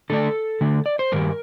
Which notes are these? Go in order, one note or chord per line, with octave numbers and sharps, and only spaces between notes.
D3 A3 D4 A4
D3 A3 D4
D5
C5
G2 D#3 G3 A#4